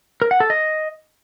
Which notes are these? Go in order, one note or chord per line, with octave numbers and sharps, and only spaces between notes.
A#4
F#5
A4
D#5